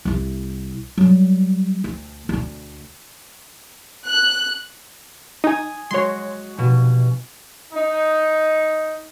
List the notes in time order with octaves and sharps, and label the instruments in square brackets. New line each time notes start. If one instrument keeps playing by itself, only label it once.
[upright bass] C2 E4
F#3 G3
D2
D2 D3
[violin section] F#6
[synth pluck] D#4 [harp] G#5 D#6
[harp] G#3 F#4 [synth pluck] C#5 C6
[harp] F1 B2
[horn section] D#4